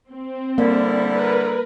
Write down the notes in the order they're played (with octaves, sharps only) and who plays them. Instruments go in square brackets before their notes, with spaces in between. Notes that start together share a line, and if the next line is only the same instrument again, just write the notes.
[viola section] C4
[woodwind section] D3 G3 E4 [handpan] A#3
[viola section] A#4 B4